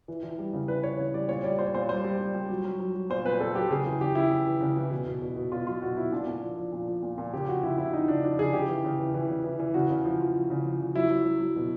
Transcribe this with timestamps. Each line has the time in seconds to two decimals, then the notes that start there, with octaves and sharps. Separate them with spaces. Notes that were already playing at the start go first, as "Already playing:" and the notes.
0.08 E3
0.23 E3
0.39 G3
0.53 C#3
0.68 E3 B4
0.83 E3 C#5
0.99 C#3
1.14 G3 D5
1.28 A#2 C#5
1.44 G3 D5
1.59 A#2 C5
1.67 C#5
1.74 A#2 C5
1.89 G3 C5
2.04 G3
2.20 G3
2.35 G3
2.50 F#3
2.65 F#3
2.80 F#3
2.95 F#3
3.10 A#2 C5
3.25 A#2 B4
3.40 A#2 A4
3.55 F#3 G4
3.70 C#3 G#4
3.86 E3
4.01 C#3 G4
4.15 C#3 E4
4.31 E3
4.47 E3
4.61 C#3
4.77 E3
4.91 B2
5.06 B2
5.22 B2
5.36 B2
5.52 B2 F4
5.67 F#3 F4
5.82 B2 F#4
5.97 B2 E4
6.12 A#2 D4
6.27 A#2
6.42 F3
6.58 F3
6.72 A#2
6.87 F3
7.03 A#2
7.18 A#2
7.33 C#3 G4
7.48 F3 F#4
7.63 C#3 E4
7.78 C#3 E4
7.93 F3 D#4
8.08 C#3 D4
8.24 F3 D4
8.39 C#3 G#4
8.53 C#3 G4
8.68 E3
8.85 C#3
8.99 E3
9.14 E3
9.29 C#3
9.44 E3
9.59 E3
9.74 C#3 F#4
9.90 C#3
10.05 F3
10.20 F3
10.36 F3
10.50 C#3
10.65 F3
10.81 C#3
10.95 F#3 E4
11.10 F#3
11.26 F#3
11.41 F#3
11.56 B2